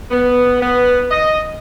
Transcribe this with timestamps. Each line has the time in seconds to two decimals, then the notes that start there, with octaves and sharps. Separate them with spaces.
0.11 B3
0.61 B3
1.11 D#5